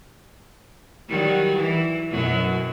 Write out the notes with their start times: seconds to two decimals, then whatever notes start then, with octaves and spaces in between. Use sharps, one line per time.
1.09 D#3 F#3 G3
1.56 E3
2.11 F#2 B2 F#3